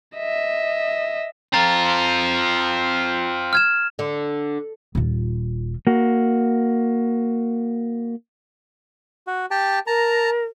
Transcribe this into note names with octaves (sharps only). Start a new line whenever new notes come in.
D#5 E5
C4 F4 A#5 A6
F6 G#6 E7
D3
D#1 F4
A#3 F#4
F#4
G4 G5 A5
A#4 A5 A#5